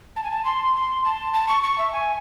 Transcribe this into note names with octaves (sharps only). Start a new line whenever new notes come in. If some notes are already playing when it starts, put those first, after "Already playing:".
A5
G#5
A5
C6
C6
A5
A5
C#6
C#6
E5
G#5